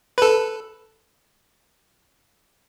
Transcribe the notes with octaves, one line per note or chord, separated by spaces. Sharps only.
A4 B4